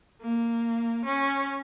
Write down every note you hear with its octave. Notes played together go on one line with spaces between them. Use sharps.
A#3
C#4